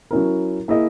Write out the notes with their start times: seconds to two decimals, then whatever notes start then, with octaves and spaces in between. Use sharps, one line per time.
0.11 F#3 C#4 E4 A#4
0.68 A#3 E4 G#4 D#5